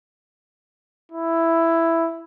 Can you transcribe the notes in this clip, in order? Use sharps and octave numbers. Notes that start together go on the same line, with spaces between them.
E4